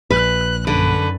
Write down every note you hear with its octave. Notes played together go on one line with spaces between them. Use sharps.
A#1 B4 F#6
F#2 D3 B4